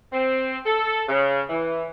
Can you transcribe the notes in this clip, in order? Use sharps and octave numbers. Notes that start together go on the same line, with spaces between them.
C4
A4
C#3
E3